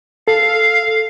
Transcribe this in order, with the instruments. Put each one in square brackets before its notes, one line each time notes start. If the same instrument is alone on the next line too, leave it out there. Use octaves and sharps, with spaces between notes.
[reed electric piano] A4 [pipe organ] F5